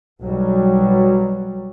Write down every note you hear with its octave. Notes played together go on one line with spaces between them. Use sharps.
B1 F#3 G3